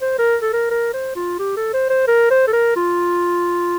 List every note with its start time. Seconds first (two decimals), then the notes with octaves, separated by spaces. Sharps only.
0.01 C5
0.18 A#4
0.42 A4
0.53 A#4
0.70 A#4
0.94 C5
1.16 F4
1.39 G4
1.57 A4
1.74 C5
1.90 C5
2.08 A#4
2.31 C5
2.47 A4
2.53 A#4
2.76 F4